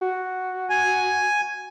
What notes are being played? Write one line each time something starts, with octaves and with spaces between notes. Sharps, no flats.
F#4
G#5